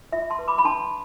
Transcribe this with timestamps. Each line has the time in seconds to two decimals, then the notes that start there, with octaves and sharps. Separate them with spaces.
0.12 F4 E5
0.30 A5 C6
0.39 B4
0.48 B5 D6
0.58 B5
0.65 D4 A5 C6